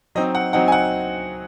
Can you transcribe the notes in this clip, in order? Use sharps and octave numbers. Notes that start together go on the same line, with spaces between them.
F#3 C4 D#4 D#5
F#5
F#3 C4 D#4 F#5
G#5
F#5